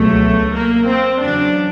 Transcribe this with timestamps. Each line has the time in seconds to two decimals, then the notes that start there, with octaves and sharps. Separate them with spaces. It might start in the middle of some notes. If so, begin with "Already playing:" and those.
Already playing: C#2 B2 F#3 A3
0.54 A#3
0.87 C4
1.20 E2 C#3 F#3 D4